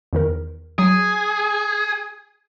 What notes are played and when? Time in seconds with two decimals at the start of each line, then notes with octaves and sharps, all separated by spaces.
0.13 E2 D#3 A#4
0.79 F#3 G#4